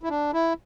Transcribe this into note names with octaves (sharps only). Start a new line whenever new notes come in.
E4
D4
E4